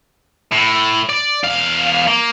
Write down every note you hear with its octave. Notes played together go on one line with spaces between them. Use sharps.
A2
D5
E2 F5
A#3